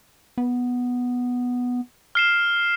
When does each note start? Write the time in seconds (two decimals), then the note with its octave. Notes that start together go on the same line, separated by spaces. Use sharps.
0.38 B3
2.15 F6 C7 E7